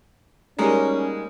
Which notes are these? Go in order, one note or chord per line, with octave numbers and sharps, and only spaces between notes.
G3 G#3 A#3 C#4 D#4